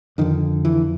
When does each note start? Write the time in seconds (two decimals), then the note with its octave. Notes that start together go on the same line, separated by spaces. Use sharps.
0.18 F2 D3 D#3
0.65 E3